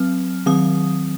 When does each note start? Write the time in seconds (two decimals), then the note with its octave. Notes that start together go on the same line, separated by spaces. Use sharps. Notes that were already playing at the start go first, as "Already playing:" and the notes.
Already playing: F#3 C4 F6
0.46 D#3 F#3 C4 D#6